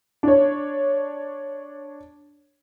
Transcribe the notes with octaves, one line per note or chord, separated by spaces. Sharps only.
D4 C#5